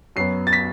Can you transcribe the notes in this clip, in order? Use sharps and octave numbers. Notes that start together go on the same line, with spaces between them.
F#2 F#3 B3 C7
A6
B6